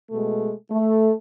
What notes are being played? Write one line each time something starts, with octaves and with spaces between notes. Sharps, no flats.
B2 G#3 A3
A3